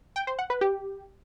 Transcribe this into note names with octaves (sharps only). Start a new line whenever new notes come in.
G5
C5
F#5
B4
G4